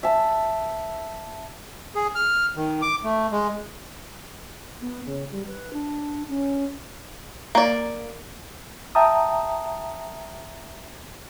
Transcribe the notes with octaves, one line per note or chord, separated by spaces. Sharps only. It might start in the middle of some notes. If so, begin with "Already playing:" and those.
E5 A5
G#4
F6
D#3
D6
A3
G#3
B3
C#3
G3
B4
D4
C#4
A#3 D5
E5 G5 A5 A#5 D#6